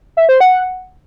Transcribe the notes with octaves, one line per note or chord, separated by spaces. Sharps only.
E5
C5
F#5